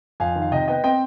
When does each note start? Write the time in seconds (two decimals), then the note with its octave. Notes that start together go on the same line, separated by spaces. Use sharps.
0.20 F2 F5 G#5
0.36 D#3
0.42 F5
0.52 C3 D#5 G5
0.68 B3 D#5 G5
0.84 C4 D#5 G5